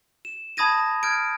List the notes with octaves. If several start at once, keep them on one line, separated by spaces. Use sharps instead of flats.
E7
A5 B5 D#6 G#6 A#6 D#7
F6 G6 G#6 D7